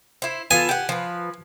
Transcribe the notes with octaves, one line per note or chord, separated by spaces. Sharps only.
E4 C5
B3 F4 A4 G#5
G4 F#5
F3 B4